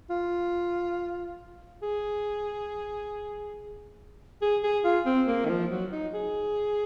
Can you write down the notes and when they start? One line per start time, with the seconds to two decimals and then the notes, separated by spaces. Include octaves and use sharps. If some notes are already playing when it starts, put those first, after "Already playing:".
0.10 F4
1.82 G#4
4.42 G#4
4.63 G#4
4.84 F4
5.06 C4
5.27 A#3
5.45 D#3
5.50 F3
5.71 F#3
5.92 D#4
6.14 G#4